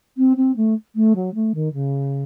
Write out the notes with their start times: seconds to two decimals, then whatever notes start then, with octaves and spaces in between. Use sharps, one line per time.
0.17 C4
0.37 C4
0.56 A3
0.95 A3
1.15 F#3
1.34 A3
1.54 D#3
1.73 C#3